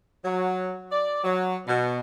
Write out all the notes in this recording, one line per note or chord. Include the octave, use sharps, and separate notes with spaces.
F#3
D5
F#3
B2